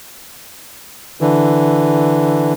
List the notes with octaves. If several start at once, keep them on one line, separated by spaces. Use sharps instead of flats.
D3 E3